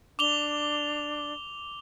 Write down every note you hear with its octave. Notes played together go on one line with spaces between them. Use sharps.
D4 D6 F7 G7